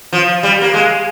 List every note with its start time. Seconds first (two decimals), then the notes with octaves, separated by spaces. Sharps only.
0.13 F3
0.43 G3
0.62 A#3
0.74 G#3